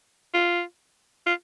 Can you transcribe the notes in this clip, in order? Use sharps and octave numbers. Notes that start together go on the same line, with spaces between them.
F4
F4